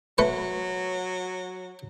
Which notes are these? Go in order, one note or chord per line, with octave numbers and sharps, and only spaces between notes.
F#3 A3 B4 C#6